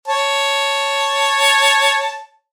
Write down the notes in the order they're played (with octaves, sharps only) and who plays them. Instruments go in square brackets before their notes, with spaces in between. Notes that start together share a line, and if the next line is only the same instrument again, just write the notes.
[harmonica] C#5 A5